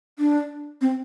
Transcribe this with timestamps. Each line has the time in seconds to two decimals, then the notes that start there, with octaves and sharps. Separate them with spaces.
0.19 D4
0.81 C4